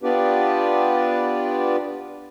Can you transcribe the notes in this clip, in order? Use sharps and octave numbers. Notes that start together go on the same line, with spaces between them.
B3 D4 F4 G4 B4 D5